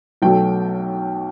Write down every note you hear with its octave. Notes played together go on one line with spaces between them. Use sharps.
B1 B2 F#3 A3 G5